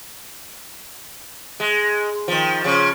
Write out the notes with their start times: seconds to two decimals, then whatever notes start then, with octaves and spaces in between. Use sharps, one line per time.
1.60 G#3
2.28 D#3 F3
2.64 C#3 F3